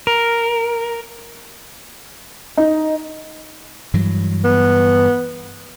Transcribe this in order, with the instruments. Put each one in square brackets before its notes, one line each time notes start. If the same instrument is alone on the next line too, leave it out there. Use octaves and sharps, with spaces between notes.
[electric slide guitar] A#4
[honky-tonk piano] D#4
[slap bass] G2 E3 F#3
[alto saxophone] B3